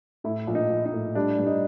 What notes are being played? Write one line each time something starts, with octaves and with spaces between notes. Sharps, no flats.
A2 E4
A#1
D#4
A#1
D#4
A2
G3 D4
G2
D#4